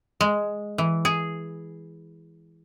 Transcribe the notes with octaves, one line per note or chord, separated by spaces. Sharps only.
G#3
E3
G#4